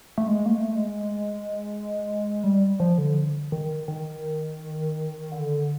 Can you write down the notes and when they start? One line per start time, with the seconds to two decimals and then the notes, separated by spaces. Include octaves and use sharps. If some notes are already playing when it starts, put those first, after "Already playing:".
0.18 A3
0.28 G#3
0.46 A#3
0.52 A3
0.75 G#3
2.44 G3
2.80 F3
2.98 D3
3.52 D#3
3.88 D#3
5.32 D3